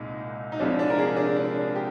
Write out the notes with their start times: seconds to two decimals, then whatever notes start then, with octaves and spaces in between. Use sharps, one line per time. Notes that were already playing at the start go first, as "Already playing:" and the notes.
Already playing: C2 A#2 G#3 D#4
0.52 D#4
0.60 C2 C3 F3 G#3 D4
0.79 D4
0.90 A#4
0.98 G#4
1.17 D4
1.36 D4
1.75 G4